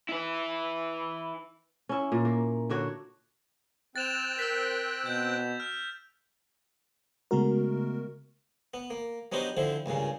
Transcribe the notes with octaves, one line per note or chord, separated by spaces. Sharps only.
E4 B4
C#4 E4
A#2
A#3
D3 D4 F#4 C#5
C4 G5 F#6 A6 E7 F7
A#4 E6 A6 B6
B2 G6
F6
C#3 G#3 A3 B3 F#4 A#4
B3
A#3
F#3 B3 D4 D#4 G4 C5
D3 F3 C4 E4
C#2 G2 A#2 C#3